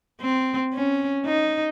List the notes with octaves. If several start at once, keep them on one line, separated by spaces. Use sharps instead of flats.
C4
C#4
D#4